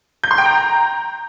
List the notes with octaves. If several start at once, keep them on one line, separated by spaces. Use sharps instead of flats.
G6
C6
G5
A#5